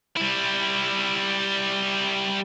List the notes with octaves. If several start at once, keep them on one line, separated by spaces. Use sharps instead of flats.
G3 E4